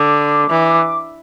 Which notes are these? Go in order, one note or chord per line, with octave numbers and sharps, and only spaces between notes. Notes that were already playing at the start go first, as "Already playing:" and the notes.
Already playing: D3 D6
E3